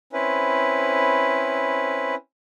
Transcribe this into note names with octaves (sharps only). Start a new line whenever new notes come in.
C4 C#4 E4 B4